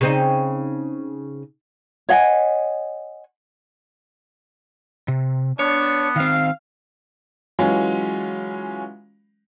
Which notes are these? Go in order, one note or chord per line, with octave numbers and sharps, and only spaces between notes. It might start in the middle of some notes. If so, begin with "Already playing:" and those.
C#3 C4 D#4
C#5 D#5 F#5 G#5
C3
B3 D4 C#5
D#3 C4 F5
E3 F#3 G#3 C#4 F4